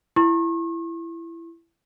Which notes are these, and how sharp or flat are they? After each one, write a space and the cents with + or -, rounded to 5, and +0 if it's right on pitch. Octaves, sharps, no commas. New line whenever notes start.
E4 +20 C#6 -40